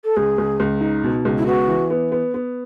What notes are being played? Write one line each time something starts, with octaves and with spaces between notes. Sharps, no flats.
A4
C#2 G#4
C#2
C#2
D#4
B2
C#2
E4
B3 F#4
E3
B3
B3
B3